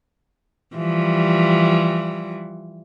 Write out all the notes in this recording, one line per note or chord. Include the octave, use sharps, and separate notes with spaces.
E3 F3 G3